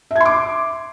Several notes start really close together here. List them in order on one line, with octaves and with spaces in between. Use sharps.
E5 G#6 C6 D6